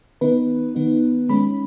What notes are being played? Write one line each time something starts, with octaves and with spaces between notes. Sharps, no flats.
D#3 B3 D#4 B4
D#3 B3 D#4
D#3 G#3 C#4 B5